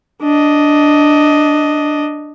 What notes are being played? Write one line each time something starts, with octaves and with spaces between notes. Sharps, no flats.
D4 D#5